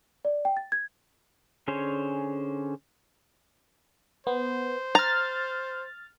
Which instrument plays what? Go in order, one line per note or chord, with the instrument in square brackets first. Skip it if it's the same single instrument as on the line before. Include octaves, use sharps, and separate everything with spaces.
[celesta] D5
G5
A6
G#6
[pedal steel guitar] D3 C#4 G#4 C5 C#5
[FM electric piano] B3 [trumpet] C5
[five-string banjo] A#5 [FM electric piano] F6 A6